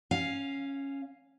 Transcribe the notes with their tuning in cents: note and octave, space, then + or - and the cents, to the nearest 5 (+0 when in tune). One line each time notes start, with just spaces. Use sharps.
C#4 -5 F5 +0